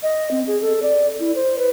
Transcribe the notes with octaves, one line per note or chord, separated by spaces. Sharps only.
D#5
C4
G#4
A4
D5
E4
C5
B4